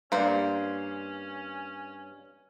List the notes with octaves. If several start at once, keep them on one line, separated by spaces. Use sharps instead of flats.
G2 A#3 C#4 C5 D5